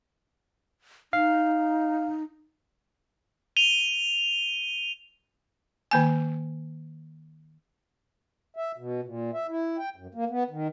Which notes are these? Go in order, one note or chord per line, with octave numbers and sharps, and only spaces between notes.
D#4 F5
D#7 F7 G7
D#3 A#3 G#5
E5
B2
A#2
E5
E4
G5
F#2
A#3
B3
D#3